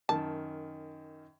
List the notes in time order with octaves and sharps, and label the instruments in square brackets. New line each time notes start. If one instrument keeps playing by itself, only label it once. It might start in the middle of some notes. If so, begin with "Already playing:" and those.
[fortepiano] F#2 D#3 [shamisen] A5